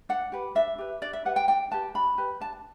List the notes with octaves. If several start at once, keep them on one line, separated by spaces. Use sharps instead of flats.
D4 F#5
G4 B4
D4 E5
G4 B4
D4 D5
E5
G4 B4 F#5
G5
D4 G5
G4 B4 A5
D4 B5
G4 B4
D4 A5